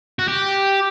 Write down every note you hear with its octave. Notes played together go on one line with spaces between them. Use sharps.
F#4
G4